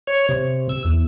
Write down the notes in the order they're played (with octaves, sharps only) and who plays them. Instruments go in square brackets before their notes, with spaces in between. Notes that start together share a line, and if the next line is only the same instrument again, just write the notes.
[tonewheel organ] C#5
C3
E6
E2